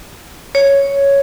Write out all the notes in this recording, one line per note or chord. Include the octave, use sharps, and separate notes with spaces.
C#5